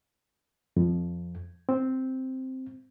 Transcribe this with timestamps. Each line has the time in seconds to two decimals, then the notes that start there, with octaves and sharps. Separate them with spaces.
0.77 F2
1.69 C4